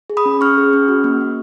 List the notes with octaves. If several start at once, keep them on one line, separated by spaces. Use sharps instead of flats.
G#4
B5 D#6
C#4
C#4 C#6 F6
G#4
C#4
F#4
A#3
A#3